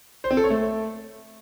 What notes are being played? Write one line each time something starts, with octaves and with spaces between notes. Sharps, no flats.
C5
C4
A4
C#5
A3